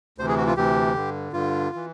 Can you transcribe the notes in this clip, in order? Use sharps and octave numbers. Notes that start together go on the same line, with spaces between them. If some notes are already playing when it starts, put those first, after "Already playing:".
D2 C3 E3 C5
G#4
F#4
F4
D2 C3 E3 G4
G2 D3
G2 D3 F4
E3